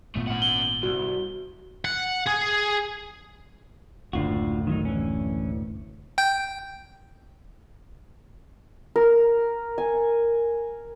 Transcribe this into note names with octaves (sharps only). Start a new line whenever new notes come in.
G#1 A#2 A3 B3
C#4 F#5
G7
C2 F#4
F#5
G#4
F#1 D2 A2 D3 F4 F#4
D#3 F#3 D#4
E3 C#4
G5 G6
A#4
G#5